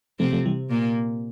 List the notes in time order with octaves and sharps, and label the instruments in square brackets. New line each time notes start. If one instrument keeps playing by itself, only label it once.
[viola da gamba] C3 C4 [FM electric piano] F3 A3
[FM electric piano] F3 A3
E3 G3
[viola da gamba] A#2 A#3